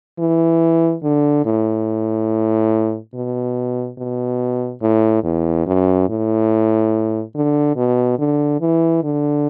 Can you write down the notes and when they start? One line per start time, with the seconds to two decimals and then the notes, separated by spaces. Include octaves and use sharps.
0.19 E3
1.03 D3
1.46 A2
3.14 B2
3.98 B2
4.81 A2
5.24 E2
5.67 F#2
6.09 A2
7.35 D3
7.76 B2
8.19 D3
8.61 E3
9.03 D3